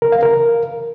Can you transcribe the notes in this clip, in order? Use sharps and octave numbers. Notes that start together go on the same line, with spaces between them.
A#4
F5
A#4